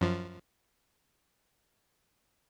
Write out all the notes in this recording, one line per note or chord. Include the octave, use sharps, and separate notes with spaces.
F#2 F3